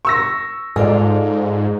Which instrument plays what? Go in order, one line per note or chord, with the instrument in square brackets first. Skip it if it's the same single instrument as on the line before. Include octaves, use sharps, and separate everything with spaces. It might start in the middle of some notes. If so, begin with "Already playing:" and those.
[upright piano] C#6 E6 A#6
[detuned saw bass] G#2 [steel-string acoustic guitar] F4 A4 D5